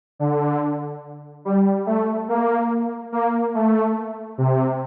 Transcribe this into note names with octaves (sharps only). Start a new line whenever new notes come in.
D3
G3
A3
A#3
A#3
A3
C3